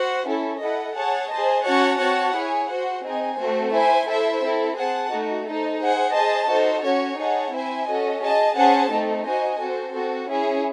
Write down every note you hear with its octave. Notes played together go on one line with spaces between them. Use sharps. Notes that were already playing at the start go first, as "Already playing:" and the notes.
Already playing: F#4 C5 F#5
C#4 E4 A4
E4 A4 D#5 F#5
G#4 C#5 F#5 A5
G#4 C5 D#5 A5
C#4 F#4 C#5 F#5 A5
C4 F#4 C#5 F#5 A5
E4 G#4 C#5 G#5
F#4 C5 F#5
C4 D#4 G#4 D#5 G#5
A3 C4 F#4 C5
E4 C5 E5 G#5
E4 A4 C5 E5
C4 E4 A4
G#4 C5 F#5 A5
A3 D#4 F#4
D#4 A4 C5
G#4 C5 F#5
G#4 C5 D#5 A5
D#4 F#4 A4 C5
C#4 F#4 C#5
D#4 G#4 C#5 F#5 A5
C4 E4 C5 E5 G#5
C#4 F#4 A4 D#5
G#4 D#5 A5
C#4 G#4 C5 F#5 A5
A3 C4 D#4 A4
D#4 F#4 C5 D#5 G#5
C4 F#4 A4 C5
C4 F#4 A4
C#4 E4 G#4